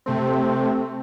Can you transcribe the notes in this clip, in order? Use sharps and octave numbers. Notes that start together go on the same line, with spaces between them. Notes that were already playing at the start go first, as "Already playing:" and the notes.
C3 A3 C4